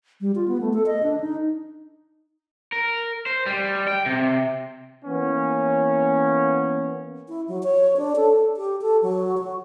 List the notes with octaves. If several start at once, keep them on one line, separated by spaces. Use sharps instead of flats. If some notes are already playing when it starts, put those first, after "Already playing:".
G3
F4
B3
A3
A4
D#5
D4
D#4
A#4
C5
G3
G5
C3
E3 A#3 B3 C#4
E4
F#3
C#5
D4
A4
G4
A4
F#3
F#4